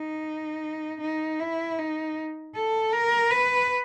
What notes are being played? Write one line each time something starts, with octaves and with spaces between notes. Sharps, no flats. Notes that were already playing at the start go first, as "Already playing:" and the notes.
Already playing: D#4
D#4
E4
D#4
A4
A#4
B4